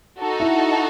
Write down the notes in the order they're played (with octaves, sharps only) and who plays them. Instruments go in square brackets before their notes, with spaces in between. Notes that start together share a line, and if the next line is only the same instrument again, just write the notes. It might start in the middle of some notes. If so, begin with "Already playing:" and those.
[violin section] D#4 F#4 A4
[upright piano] E4